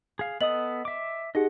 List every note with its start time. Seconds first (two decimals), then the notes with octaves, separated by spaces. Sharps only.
0.19 G#4 F5
0.41 B3 A4 D#5 D#6 F#7
0.85 E5 D6
1.35 D#4 G4 G#4 D#5 F#5